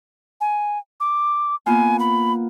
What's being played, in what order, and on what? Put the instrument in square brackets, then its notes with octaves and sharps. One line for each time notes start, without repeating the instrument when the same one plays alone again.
[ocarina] G#5
D6
[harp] A#3 B3 F4 [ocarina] G#5
[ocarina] B5